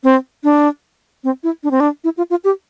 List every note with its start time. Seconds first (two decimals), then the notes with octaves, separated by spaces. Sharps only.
0.04 C4
0.44 D4
1.24 C4
1.43 E4
1.63 D4
1.71 C4
1.80 D4
2.04 E4
2.17 F4
2.30 F4
2.44 G4